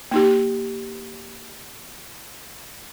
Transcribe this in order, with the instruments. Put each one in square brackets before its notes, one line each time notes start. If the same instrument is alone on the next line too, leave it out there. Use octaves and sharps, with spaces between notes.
[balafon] A#3 D#4 G4